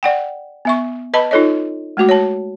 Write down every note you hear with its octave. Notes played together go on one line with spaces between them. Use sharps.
D5 F#5 G5
B3 E5 C#6
B4 D#5 A5 B5
D#4 F4 A4 C#5 D#5
G#3 A3 F#4 D6
C#5 A5